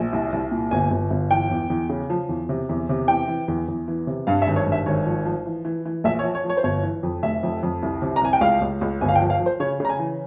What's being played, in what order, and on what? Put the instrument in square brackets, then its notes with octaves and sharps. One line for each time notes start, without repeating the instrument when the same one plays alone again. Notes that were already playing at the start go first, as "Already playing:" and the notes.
Already playing: [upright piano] A#1
C2
C2
A#2
G1 G#5
G1
G1
E3 G5
E2
E2
C#3
F3
E2
C3
E2
C3
E3 G5
E3
E2
E2
E3
C3
G2 F5
E5
G#1
C#5
G2
E5
G#1 C#5
F3
F3
E3
E3
E3
A#1 E5
C#5
F3
C#5
F3
C#5
C5
G1 C#5
E3
F2
F1 E5
F2
F2
C2
C3
A#5
C2 G#5
G5
C#2 F5
C#2
C#2
G1 G#5
F5
G5
F3
F5
F3
C5
C#3 C#5
C#3
A#5
G#5
E3